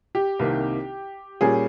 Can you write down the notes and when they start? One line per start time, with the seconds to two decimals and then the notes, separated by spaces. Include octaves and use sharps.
0.15 G4
0.39 C2 C3 D#3 A#3 D#4
1.41 A#2 G3 C#4 G#4